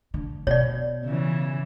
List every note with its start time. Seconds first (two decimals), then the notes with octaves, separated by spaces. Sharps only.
0.14 D3
0.47 B2 C#5 D5
1.05 C#3 E3